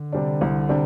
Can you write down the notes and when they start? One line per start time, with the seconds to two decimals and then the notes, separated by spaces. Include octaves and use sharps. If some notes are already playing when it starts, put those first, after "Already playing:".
Already playing: D3
0.13 C3 G3 D4
0.41 C2
0.69 C3 G3 D4